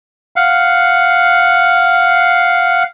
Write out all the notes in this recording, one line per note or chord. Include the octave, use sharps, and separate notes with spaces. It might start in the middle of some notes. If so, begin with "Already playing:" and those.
F5 F#5